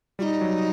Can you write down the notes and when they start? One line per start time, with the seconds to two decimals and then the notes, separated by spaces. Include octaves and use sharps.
0.19 G3 F#4
0.22 D#4
0.41 F#3